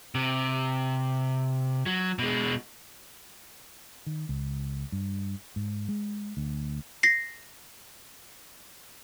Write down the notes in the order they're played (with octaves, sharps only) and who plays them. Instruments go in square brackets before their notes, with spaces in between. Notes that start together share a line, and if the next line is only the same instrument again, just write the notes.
[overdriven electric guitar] C3
F#3
B2 G#3
[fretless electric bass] D#3
C#2
G2
G#2
G#3
D2
[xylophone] A#6 C7